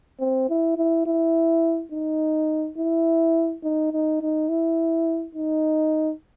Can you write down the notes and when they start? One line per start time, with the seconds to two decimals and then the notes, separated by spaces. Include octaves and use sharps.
0.20 C4
0.49 E4
0.77 E4
1.06 E4
1.92 D#4
2.78 E4
3.64 D#4
3.92 D#4
4.21 D#4
4.49 E4
5.35 D#4